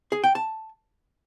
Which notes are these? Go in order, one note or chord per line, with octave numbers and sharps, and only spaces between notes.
G#4
G5
A5